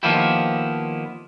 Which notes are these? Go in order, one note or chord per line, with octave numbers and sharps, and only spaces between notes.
D#3 F3 A#3 B3 E4 G4